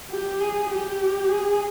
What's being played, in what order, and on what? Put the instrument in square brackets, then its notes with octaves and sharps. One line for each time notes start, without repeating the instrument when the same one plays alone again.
[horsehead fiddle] G4
G#4
G4
G#4